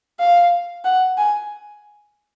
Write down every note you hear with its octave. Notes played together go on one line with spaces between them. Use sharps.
F5
F#5
G#5